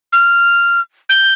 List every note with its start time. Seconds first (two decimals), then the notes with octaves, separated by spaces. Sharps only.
0.13 F6
1.09 G6